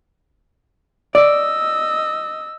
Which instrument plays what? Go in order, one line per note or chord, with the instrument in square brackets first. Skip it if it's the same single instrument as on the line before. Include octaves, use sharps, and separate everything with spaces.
[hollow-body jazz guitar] D5 [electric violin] D#5 E6